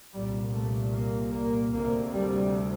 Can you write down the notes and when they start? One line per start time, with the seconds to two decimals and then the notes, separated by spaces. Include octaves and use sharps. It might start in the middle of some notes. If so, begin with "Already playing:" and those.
0.13 C2 A#2 G3
0.53 A3
0.92 A#3
1.32 A#3
1.72 D2 C3 A#3
2.12 G3